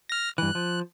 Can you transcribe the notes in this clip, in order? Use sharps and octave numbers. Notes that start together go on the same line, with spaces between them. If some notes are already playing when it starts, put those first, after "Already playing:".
F6 A#6
G2 E3 F#6
F3